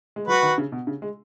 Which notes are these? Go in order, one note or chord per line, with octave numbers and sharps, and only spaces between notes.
G#3
F#3 F#4 B4
D#3
C#3
B2
C#3
G#3